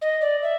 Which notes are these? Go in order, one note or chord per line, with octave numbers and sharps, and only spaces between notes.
D#5
D5
E5